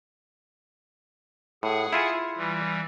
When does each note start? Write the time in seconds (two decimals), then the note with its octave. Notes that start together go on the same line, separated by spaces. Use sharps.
1.63 A2 G#4 F#5
1.93 E4 F4 G#5
2.37 E3 G3